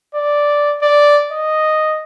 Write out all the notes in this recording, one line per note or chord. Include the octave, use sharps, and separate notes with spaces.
D5
D5
D#5